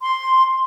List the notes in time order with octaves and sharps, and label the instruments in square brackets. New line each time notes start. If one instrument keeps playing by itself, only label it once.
[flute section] C6